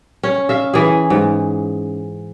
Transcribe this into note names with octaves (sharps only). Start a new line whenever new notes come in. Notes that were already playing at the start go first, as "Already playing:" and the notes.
C#4
E5 F5
E3 G#4
G#2